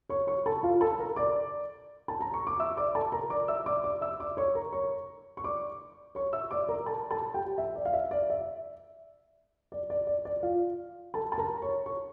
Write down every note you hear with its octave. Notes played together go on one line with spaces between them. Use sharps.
C#5 C#6
C#5 C#6
A4 A5
F4 F5
A4 A5
A#4 A#5
D5 D6
A5
A#5
C#6
D6
E5 E6
D5 D6
A4 A5
A#4 A#5
D5 D6
E5 E6
D5 D6
D5 D6
E5 E6
D5 D6
C#5 C#6
A#4 A#5
C#5 C#6
C#6
D5 D6
C#5 C#6
E5 E6
D5 D6
A#4 A#5
A4 A5
A4 A5
G4 G5
E5
D5
F5
E5
D5
E5
D5
D5
D5
D5
F4 F5
A4 A5
A5
A#4 A#5
C#5 C#6
C#5 C#6